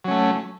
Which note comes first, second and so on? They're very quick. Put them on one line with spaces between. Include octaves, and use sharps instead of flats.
F#3 C#4 A3